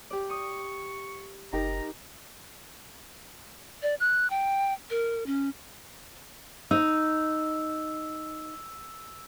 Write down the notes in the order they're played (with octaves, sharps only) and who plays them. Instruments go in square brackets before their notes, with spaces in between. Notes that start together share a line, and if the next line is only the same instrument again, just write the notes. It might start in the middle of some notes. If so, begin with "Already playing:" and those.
[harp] G4 D5
[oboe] C#6 [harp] D#6
[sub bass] F#1 [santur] D#4 G4 A#4 [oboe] A#5
[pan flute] D5
F#6
G5
A#4
C#4
[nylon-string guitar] D#4 [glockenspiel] E6